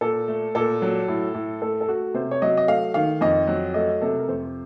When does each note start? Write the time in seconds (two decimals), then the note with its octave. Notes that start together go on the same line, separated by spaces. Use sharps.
0.01 A#2 A4
0.28 A3
0.55 A#2 A4
0.82 F#3
1.08 A2
1.34 A2
1.62 A3 A4
1.81 A4
1.88 A3 F#4
2.14 C3 C5
2.31 C#5
2.42 F#3 D#5
2.57 D#5
2.68 A3 F5
2.94 D#3 F5
3.21 F2 D#5
3.48 F#3
3.74 A3 D#5
4.01 C3 A4
4.19 A#4
4.28 F2 C5